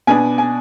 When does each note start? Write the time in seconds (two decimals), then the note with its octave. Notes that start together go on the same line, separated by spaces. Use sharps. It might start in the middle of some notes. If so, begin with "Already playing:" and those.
0.07 B2 B3 D4 G#5
0.38 G#5